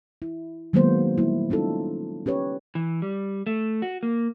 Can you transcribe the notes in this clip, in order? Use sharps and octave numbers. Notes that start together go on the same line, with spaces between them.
E4
D#3 F#3 G#3 A#3 B3 C5
G3 A#3 E4
C#4 D#4 F4 A4
C#4 G4 B4 C#5
E3
G3
A3
F#4
A#3